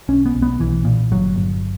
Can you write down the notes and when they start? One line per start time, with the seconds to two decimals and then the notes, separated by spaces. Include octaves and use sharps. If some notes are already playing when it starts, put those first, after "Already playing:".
0.08 B1 C#4
0.26 B3
0.35 B1
0.42 B3
0.59 B1 E3
0.85 A#2
1.11 G1 F#3
1.36 G1